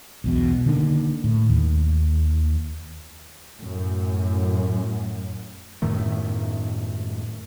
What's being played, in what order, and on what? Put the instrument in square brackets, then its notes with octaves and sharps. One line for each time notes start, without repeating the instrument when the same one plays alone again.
[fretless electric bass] B1 E2 B2
D3 D#3 A#3 D4
A2
D#2
[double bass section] F#2 A2
[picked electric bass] F#2 A2 D#3 A3